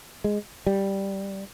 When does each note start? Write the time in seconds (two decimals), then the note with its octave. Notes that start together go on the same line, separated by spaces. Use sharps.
0.24 G#3
0.67 G3